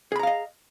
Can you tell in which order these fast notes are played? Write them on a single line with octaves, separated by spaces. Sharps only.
G#4 B5 A#5 F5 D#5